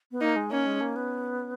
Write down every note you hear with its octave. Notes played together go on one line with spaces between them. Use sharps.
B3
A#3 D#4
G#3
A#3 C#4
G#3
A#3
B3